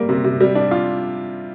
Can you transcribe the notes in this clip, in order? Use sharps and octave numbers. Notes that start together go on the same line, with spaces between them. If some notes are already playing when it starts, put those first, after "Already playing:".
Already playing: G3 A#3
C3
C3
G3
D4
F4